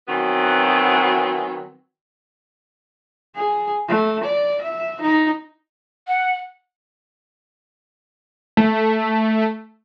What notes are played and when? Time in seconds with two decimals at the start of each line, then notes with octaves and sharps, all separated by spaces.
0.08 D#3 E3 F#3 B3 C4 F#4
3.35 G#4
3.88 A3
4.23 D5
4.62 E5
5.01 D#4
6.08 F#5
8.57 A3